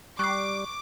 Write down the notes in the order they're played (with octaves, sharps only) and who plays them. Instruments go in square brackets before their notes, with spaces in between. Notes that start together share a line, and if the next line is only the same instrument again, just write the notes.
[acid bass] G3 [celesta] C#6 [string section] D6 [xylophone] F#6 C7